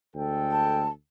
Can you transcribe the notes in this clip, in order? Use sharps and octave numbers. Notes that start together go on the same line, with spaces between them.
D2 G#3 A4 G5
A5